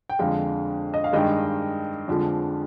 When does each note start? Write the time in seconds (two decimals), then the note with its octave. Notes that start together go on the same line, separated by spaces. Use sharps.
0.10 G5
0.19 F2 D3 G#3 F5
0.94 D#5
1.04 F5
1.13 G2 D#3 G#3 D#5 G5
2.08 F2 D3 F3 G#3